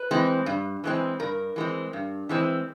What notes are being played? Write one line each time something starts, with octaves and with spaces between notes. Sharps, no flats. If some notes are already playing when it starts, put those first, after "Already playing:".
Already playing: B4
E3 G#3 C4
G2
E3 G#3 C4
G2 A#4
E3 G#3 C4
G2
E3 G#3 C4